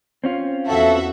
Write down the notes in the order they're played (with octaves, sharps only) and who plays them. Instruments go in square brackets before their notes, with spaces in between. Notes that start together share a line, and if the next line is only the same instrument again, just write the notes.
[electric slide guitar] C4 C#4 F4
[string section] E2 F#4 E5 [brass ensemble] A4